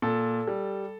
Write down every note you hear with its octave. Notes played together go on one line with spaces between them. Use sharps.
A#2 A4
G3